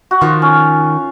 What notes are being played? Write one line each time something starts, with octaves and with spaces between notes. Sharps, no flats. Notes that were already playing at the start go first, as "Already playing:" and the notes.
F#4
D#3 F3 F4
C#4